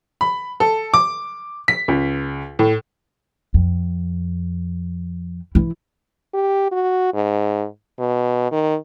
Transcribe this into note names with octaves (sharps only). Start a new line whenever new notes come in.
B5
A4
D6
B6
C#2
A2
F2
E3 E4
G4
F#4
G#2
B2
D#3